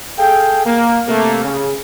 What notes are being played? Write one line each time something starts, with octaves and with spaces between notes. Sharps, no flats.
G#4 A4 F5 G5
A#3
C3 A3 A#3
C#3